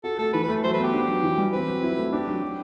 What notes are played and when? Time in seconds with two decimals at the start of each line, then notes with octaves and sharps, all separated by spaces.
0.04 F#4 A4
0.19 A3 A4
0.33 E3 B4
0.43 B4
0.48 A3
0.63 F#3 C5
0.73 B4
0.78 B3
0.83 G4
0.93 D4
1.08 F#3
1.23 E3
1.38 G3
1.53 C4 B4
1.68 F#3
1.83 E4
1.97 A3
2.12 D4 G4
2.27 F#3
2.42 F#3